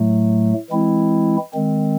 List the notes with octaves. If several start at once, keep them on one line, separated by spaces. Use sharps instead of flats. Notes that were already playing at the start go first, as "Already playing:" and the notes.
Already playing: A2 F#3 A3
E3 G#3 C4 E4
D#3 G#3 C4